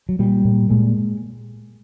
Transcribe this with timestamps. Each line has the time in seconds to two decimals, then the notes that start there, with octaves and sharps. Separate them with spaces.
0.09 F#3
0.19 A#2 G3
0.45 A#2
0.70 A#2 G#3